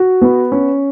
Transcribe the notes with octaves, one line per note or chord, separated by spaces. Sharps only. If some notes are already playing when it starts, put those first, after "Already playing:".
Already playing: F#4
B3
C#4